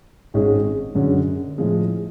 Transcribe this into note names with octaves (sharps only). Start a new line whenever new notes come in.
G#1 G#2 G#3 C#4 G#4
F#2 D3 G#3 C#4
A2 F3 G#3